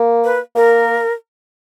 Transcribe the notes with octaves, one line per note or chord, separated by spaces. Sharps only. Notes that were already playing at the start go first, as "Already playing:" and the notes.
Already playing: A#3
B4
A#3 A#4